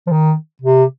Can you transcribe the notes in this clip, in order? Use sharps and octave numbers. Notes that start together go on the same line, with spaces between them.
F3
D#3
C3